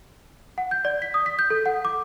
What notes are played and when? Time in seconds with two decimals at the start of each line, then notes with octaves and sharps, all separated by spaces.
0.58 F#5
0.71 G6
0.85 D5
1.02 B6
1.14 D#6
1.26 B6
1.39 G6
1.50 A4
1.66 F#5
1.85 D6